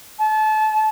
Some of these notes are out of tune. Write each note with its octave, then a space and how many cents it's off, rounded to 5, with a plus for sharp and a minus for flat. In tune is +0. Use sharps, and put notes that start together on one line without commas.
A5 -30